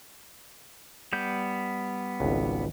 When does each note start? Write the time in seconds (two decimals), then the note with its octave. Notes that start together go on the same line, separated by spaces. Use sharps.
1.13 G3 B3 G6
2.20 G#1 C#2